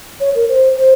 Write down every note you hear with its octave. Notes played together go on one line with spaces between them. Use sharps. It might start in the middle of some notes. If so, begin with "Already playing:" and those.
C#5
A#4
C5
C5